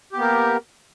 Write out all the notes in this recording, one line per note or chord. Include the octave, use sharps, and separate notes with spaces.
A#3 B3 G4 A#4